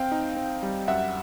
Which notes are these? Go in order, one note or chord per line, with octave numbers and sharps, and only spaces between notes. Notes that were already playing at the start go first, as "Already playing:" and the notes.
Already playing: C4 F5 G5
D#4
C4
G3
F#2 E5 F#5